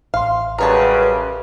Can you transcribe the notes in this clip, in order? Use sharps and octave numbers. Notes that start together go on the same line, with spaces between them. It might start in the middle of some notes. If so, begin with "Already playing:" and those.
A1 F5 C6
F#2 C#3 G3 A#4 B4 C#5 A5